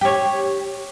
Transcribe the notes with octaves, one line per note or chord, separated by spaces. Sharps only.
G4 C#5